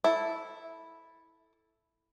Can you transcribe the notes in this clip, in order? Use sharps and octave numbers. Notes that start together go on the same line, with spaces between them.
E4 A4